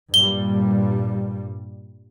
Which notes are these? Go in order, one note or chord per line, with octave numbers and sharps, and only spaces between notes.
G2 A#2 G3 G7